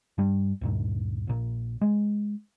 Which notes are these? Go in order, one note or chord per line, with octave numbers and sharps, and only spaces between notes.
G2 G3
D2 G2 A#2
A#1 A#2
G#3